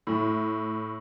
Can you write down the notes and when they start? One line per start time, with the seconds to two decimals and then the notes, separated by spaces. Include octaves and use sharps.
0.07 A2